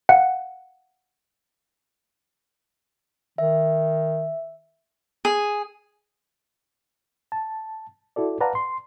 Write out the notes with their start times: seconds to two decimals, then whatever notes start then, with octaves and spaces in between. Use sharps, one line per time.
0.09 F5 F#5
3.38 D#3 E5
5.25 G#4
7.32 A5
8.16 E4 F#4 A4 D5
8.41 B4 D5 F5 F#5 A5 A#5
8.55 C6